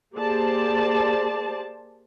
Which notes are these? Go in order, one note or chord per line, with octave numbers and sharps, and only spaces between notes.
A#3 G4 G#4 C5 D5 A5